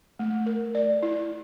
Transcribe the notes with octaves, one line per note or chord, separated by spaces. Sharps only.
A3
A#4
D5
E4